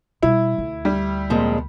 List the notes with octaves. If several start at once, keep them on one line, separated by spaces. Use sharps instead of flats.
B2 G3 E4
D2
G3
F2 A#2 G#3